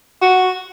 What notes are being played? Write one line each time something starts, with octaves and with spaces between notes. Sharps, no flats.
F#4